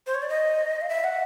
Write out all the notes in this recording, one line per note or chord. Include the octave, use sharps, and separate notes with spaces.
C5
C#5
D5
D#5
F5
E5
F#5